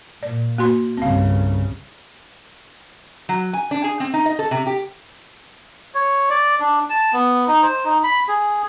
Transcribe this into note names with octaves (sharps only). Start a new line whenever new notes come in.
A#2 D5
A#3 F#4 C6
C2 G2 C#3 C4 F5
F#3
G#5
D4
G#4
C4
D#4
D#5
A4
C3
G4
C#5
D5
D4
A5
B3
D#4
C5
D#4
B5
G#4